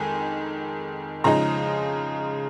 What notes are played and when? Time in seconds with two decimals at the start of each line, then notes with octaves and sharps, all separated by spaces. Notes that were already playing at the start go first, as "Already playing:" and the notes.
Already playing: F2 D#3 G#3 G#5
1.24 C#3 F3 G#3 D#4 A#5